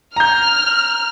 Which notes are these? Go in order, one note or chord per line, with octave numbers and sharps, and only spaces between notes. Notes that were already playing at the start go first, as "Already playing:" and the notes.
A#5 F6 G6